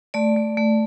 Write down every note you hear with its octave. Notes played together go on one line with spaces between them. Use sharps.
A3 D5
A3
A3